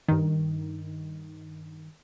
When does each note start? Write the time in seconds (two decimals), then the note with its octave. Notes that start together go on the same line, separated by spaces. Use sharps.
0.08 G2 D#3